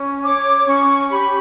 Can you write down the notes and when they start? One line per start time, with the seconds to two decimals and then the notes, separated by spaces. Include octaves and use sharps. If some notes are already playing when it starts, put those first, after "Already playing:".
Already playing: C#4
0.24 C#5 D6
0.66 C#4 C#6
1.10 G4 B5